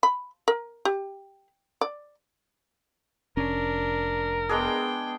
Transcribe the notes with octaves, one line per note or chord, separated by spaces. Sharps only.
B5
A#4
G4
D5
F1 C#4 D4 A#4
G#3 B3 D4 G#4 G5